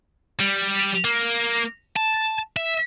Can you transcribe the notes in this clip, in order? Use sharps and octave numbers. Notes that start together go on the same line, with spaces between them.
G3
A#3
A5
E5